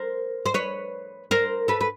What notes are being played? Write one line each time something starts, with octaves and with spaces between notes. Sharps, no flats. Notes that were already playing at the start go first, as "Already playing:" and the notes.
Already playing: A#4 C5
C5
B4 C#5
A#4 C5
A4 B4
B4